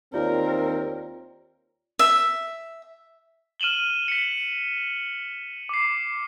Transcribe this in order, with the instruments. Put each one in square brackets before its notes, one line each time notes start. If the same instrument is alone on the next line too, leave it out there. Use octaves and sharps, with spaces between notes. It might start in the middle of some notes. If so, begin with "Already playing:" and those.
[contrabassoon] D#2 [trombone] C4 [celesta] F4 C#5 D5 [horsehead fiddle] A#4
[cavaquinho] E5
[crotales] F6 D#7 E7 F#7 G7
B6 C#7
D6 C7